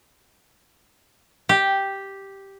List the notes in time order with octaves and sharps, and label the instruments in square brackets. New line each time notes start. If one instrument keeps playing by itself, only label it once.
[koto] G4